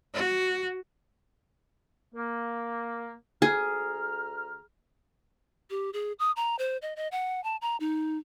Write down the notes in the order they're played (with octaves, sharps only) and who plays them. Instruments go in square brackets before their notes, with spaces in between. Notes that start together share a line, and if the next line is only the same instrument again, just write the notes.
[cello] F#4
[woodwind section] A#3
[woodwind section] D2 A#5 F6 [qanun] G#4
[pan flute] G4
G#4
D#6
A#5
C5
D#5
D#5
F#5
A5
A#5
D#4